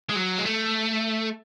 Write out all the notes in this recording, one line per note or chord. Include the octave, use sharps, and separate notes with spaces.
G#3
F#3
G#3
A3